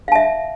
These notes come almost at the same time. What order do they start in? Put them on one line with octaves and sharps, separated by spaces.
F5 A5 E5